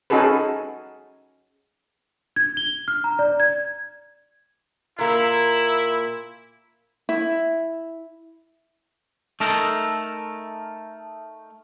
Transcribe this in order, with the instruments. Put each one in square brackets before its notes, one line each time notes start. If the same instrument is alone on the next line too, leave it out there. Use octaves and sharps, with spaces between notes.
[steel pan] C#4 D#4 F#4 G#4 A4 B4
[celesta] G#6
G7
F6
A#5
D5
G#6
[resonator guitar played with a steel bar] A#2 A#3 [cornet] E4
[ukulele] E4
[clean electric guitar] A3 D#4 A4 A#4